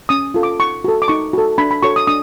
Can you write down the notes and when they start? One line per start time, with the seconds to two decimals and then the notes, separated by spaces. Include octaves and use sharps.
0.09 C#4 D#6
0.34 F4 A4
0.43 D6
0.60 D#4 C#6
0.84 F#4 A4
1.02 D6
1.08 D#4 C#6
1.33 F#4 A4
1.58 D4 B5
1.71 B5
1.83 F#4 A4 C#5 C#6
1.96 D#6
2.07 D4 D#6